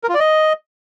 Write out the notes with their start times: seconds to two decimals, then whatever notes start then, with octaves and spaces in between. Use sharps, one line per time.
0.04 A#4
0.09 F4
0.14 D5
0.20 D#5